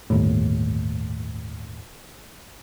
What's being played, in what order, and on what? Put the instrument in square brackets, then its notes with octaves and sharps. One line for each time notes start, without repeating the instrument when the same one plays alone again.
[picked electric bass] G1 D#2 A2